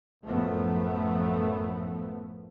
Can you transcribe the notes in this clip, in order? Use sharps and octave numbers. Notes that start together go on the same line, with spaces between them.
A1 F#2 F3 A3 B3